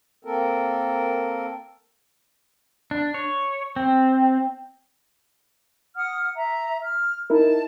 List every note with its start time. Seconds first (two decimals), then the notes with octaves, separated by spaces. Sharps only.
0.25 A#3 C4 A4 A#4
2.91 D4
3.14 C#5
3.76 C4
5.97 F#5 D#6 F6
6.36 E5 A#5
6.84 F6
7.30 D#4 E4 A#4 A5